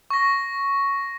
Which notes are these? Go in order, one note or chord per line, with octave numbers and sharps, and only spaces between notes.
C#6 A#6